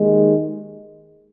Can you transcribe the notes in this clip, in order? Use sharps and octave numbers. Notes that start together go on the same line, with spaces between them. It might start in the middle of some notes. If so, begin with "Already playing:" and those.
Already playing: D#2 D#3 G#3